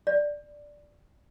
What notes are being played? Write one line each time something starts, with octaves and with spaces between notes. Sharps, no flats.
D5